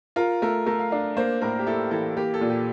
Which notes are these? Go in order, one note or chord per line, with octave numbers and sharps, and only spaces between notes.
F4 A#4
A3 A#4
A3 A#4
F5
D4 F5
A#3 C5
A2 A#4
G4
E4 A4
E3 A4
A#3 G4
A4
A#2
G4